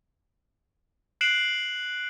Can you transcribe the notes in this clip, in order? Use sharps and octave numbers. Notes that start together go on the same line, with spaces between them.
F#6 C7 D7 E7 F#7